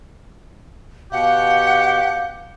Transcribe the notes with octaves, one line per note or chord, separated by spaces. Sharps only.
B2 G4 F5 F#5